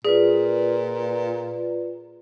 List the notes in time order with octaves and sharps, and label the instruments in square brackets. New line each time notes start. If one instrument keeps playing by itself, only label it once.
[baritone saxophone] A#2 [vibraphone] F4 B4 D5 [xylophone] G#4